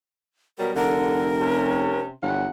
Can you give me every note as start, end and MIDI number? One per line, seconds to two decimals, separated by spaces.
0.58 0.72 47
0.58 0.72 54
0.58 0.72 55
0.58 0.75 70
0.75 2.05 29
0.75 1.31 50
0.75 2.00 70
1.40 2.11 48
1.40 2.11 61
2.22 2.46 31
2.22 2.48 40
2.22 2.48 54
2.22 2.48 78